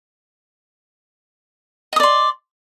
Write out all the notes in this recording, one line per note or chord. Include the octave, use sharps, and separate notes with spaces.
D5 D#5 C6 D#6